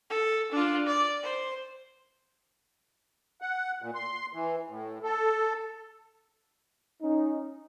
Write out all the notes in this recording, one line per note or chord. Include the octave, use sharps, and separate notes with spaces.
A4
D4 F4
D5
C5
F#5
A#2
C6
E3
A2
A4
C#4 D#4